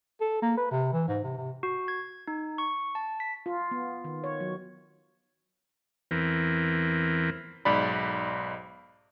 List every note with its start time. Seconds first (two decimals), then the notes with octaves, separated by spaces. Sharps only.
0.21 A4
0.42 A#3
0.57 B4
0.71 C3
0.93 E3
1.08 G#2
1.23 C3
1.38 C3
1.63 F#4
1.88 G#6
2.27 D#4
2.58 C#6
2.95 A5
3.20 B6
3.46 F4
3.71 B3
4.04 D#3
4.24 C#5
4.40 F#3
6.11 E2 E3 C4 A#4
7.65 B1 G#2 D5 B5